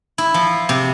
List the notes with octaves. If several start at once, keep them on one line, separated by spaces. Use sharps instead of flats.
E4
F3
C3